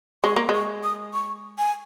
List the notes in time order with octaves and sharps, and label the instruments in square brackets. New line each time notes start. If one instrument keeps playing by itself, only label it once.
[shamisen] G#3 [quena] C#6
[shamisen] A#3
G#3
[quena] C#6
D#6
C#6
G#5